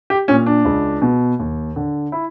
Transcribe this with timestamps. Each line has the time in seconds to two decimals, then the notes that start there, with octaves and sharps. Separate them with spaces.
0.10 G4
0.28 A#2 C#4
0.46 D4
0.65 C#2
1.02 B2
1.39 D#2
1.76 D3
2.12 E4